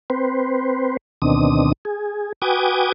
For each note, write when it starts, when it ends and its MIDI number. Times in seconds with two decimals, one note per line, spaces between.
0.10 0.97 60
0.10 0.97 71
0.10 0.97 72
1.22 1.72 38
1.22 1.72 47
1.22 1.72 51
1.22 1.72 60
1.22 1.72 62
1.22 1.72 87
1.85 2.33 68
2.42 2.92 66
2.42 2.92 71
2.42 2.92 79
2.42 2.92 80
2.42 2.92 86
2.42 2.92 87